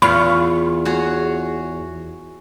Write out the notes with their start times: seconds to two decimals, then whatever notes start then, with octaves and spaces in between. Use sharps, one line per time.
0.02 E2 F4 B5 C#6 F6
0.85 F#4 G#4 C#5